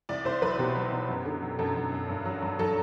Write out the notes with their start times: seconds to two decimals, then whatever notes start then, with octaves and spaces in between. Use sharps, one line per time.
0.09 C2 D5
0.25 C2 C5
0.42 F#3 B4
0.59 B2 G4
0.76 F#3
0.92 B2
1.09 F#2
1.25 D3
1.42 F#2
1.59 F#2 A4
1.76 F#2
1.92 F#2
2.09 G2
2.25 F#3
2.42 G2
2.59 F#3 A4